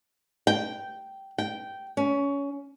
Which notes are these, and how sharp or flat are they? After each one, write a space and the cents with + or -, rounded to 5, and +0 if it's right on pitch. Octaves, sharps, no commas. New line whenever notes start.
G5 -10
G5 -10
C#4 +20